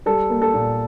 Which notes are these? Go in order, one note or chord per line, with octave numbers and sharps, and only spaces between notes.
G3 A4
A#3
A4
A#2